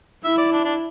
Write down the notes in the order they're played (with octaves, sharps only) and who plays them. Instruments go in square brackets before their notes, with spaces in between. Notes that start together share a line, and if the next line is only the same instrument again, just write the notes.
[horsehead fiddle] E4 [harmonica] E5
[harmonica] D5
D4
D4